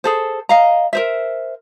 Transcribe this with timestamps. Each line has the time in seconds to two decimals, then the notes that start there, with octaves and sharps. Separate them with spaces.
0.04 G#4 A4 C5
0.49 D#5 F5 A#5
0.93 A#4 C5 E5